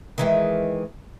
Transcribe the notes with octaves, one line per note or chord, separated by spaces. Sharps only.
D#3 E3 G#3